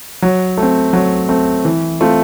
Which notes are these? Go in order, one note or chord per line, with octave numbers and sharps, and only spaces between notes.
F#3
A3
C4
F#3
A3 C4
E3
A3 C4 F4